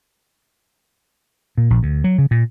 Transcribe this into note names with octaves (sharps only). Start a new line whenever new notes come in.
A#2
A#1
D2
F#3
C#3
A#2